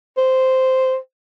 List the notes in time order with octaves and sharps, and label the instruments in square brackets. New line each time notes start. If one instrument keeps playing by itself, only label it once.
[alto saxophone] C5